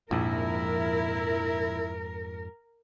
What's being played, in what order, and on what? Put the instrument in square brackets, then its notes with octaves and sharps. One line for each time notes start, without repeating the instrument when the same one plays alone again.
[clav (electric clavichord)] A#1 [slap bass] F2 G#2 [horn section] E4 [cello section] A#4